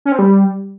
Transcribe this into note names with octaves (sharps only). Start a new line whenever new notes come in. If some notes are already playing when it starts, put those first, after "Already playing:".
C#4
C4
G3